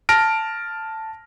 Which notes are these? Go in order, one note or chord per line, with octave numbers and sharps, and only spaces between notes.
A5 F6 A#6 D7